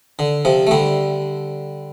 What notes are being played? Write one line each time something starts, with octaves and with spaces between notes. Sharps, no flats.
D3
C3 F3
A3
D3 G3